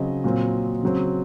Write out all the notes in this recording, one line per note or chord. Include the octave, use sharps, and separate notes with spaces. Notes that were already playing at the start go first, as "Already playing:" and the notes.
Already playing: C#3 F#3 C4 D#5
A#2 F#3 C4
C#3 F#3 C4